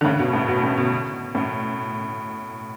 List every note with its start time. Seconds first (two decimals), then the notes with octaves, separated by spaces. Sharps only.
0.01 D3
0.04 A2 C#3
0.19 B2
0.33 A2
0.48 B2
0.63 A2
0.78 B2
1.35 A2